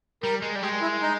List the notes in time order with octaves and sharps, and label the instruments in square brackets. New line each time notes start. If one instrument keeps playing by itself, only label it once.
[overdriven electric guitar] G3 [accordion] A#4
[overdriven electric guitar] G#3
G3
[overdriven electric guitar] G#3 [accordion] G4
[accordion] E4
D#4